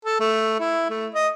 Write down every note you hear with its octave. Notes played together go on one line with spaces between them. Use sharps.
A4
A3
E4
A3
D#5